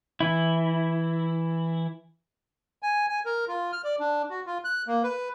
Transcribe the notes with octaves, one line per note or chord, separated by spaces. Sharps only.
E3 E4
G#5
G#5
A#4
F4
F6
D5
D4
F#4
F4
F#6
A#3
B4